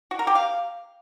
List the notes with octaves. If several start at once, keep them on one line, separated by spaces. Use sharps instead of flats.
F#4
A#4
G4
F5